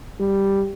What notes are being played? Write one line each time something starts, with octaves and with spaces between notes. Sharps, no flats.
G3